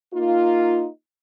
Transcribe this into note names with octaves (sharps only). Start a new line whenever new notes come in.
A#3 D#4 F4